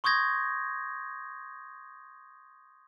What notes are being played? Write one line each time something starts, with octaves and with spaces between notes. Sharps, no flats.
C6 C#6 D#6 G6 G#6 A#6